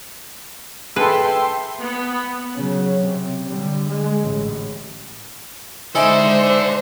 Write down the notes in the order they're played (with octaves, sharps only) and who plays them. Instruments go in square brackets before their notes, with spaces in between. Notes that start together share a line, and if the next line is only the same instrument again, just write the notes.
[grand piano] G#4 A4 [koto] B4 [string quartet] E5 G5 C6
[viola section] B3
[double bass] C#3 F#3
C3
D3 G3
G#3
A1
[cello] G#3 C5 [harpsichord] D#4 E4 G#5 [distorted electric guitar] A4 D5